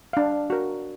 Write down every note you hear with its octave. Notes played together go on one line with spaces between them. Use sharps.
D4 F5
F#4 A#4